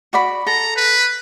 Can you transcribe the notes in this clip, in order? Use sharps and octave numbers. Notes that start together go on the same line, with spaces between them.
F#4 D5 B5
A4 A#5
B4